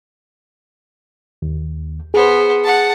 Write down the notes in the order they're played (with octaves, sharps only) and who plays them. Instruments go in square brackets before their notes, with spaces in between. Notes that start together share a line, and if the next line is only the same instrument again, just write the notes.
[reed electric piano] D#2
[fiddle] B3 C5 [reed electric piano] G#4
[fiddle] F#5 A5